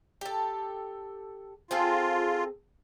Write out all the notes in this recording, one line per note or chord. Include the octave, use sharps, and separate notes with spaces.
G4 A4
C4 F4 G#4 A4